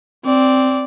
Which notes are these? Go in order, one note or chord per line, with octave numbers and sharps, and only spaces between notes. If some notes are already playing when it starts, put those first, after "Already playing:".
C4 D5